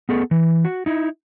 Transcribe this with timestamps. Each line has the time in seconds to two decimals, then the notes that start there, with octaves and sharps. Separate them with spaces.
0.09 B3 G#4 A4
0.31 E3
0.65 F#4
0.86 D#4 E4